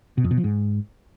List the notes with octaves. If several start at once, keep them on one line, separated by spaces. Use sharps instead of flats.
B2
F2
B2
F3
G#2